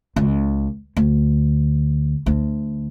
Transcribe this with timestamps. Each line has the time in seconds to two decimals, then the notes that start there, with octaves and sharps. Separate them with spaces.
0.16 C#2
0.97 D2
2.26 D2